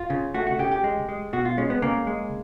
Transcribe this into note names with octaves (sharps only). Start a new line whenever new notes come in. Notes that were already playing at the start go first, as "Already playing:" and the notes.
Already playing: F4
C#3
A3 F#4
F#4
C#3 G4
G4
G#3
G#3
B2 F#4
F4
G#3 C#4
B3
C#3 A#3
G#3